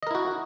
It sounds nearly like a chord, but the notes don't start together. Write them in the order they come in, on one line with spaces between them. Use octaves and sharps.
D#5 A#4 E4 F#4